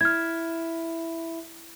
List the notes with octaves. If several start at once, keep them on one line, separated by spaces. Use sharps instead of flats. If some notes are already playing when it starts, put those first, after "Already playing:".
E4 F6 G#6